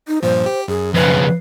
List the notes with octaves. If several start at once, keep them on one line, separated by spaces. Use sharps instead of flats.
D#4
G2 A#2 F3 C5
G4
F#2 G#4
F2 C#3 B4